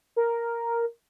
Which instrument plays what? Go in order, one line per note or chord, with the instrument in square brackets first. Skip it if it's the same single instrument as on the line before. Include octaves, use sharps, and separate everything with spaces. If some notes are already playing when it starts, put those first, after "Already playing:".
[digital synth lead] A#4